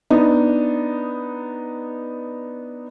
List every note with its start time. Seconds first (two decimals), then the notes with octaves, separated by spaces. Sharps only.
0.10 B3 D4 D#4